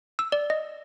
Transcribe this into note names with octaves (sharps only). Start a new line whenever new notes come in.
E6
D5
D#5